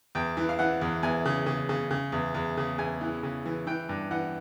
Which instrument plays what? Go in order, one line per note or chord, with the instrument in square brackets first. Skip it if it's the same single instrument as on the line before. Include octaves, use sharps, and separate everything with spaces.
[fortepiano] E2 G5
E3
F5
E3 F#5
E2
E2 G#5
C#3
C#3
C#3
C#3
E2
E2
C#3
E2 G#5
E3
C#3
E3
E3 G5
G2
E3 F#5